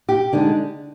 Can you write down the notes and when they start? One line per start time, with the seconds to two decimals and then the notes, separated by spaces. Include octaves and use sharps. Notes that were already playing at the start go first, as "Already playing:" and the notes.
0.09 G4
0.33 D3 G#3 D#4